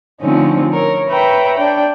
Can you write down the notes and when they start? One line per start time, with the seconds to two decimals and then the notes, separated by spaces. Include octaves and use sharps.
0.21 D3 F3 A3 C4 C#4 D#4
0.73 A#4 C#5
1.09 B4 C#5 E5 G5 A#5 B5
1.56 D4 G5